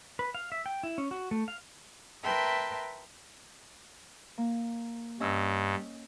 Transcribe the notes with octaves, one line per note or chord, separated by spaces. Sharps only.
B4
F5
E5
G5
E4
C#4
F#4
A3
F5
A#4 B4 E5 G5 A5 C6
A#3
G2 C#4 D#5 E6